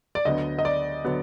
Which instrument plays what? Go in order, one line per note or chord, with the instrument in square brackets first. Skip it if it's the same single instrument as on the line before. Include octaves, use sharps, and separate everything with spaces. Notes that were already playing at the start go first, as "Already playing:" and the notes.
[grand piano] D5
D2 D3 F#3 B3 D#5
D#5
D5
D3 F#3 B3